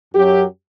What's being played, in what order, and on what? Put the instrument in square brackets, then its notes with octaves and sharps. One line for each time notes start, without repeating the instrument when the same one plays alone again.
[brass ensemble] F#2 F#3 G4